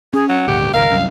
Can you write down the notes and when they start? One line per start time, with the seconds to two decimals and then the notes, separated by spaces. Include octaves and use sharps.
0.13 C#4 G#4
0.29 F#3 F#5
0.48 D#1 G#1 D2 G4
0.73 G#1 C#2 A#4 F5
0.91 C2 F#2